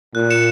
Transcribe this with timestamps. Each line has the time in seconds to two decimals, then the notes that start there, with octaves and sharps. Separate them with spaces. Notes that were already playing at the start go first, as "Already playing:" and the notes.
0.15 A#2 F#6
0.30 C#7 E7